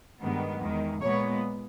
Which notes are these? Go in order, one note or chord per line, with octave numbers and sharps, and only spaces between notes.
G2 D#3 G#3 B3
E2 D#3 G#3
A#2 G#3 B3 C#5